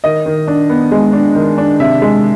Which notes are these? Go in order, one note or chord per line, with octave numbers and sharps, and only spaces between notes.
D#3 D#5
D#3
D4
B3
G#3
D4
D#3
D4
C3 E5
G#3